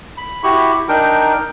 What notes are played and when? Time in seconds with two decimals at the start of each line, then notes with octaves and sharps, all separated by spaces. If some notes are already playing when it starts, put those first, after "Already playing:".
0.17 B5
0.43 E4 F#4 G4 B5 C#6
0.89 D4 D#4 A#4 G5